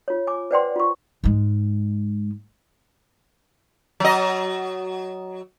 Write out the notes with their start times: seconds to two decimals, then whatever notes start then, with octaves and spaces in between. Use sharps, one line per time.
0.08 F4 C#5
0.27 G#5 D6
0.51 B4 C5 D5 F#5 G5 C6
0.76 F4 C#6
1.24 G#2 G#3
4.00 F#3 D#5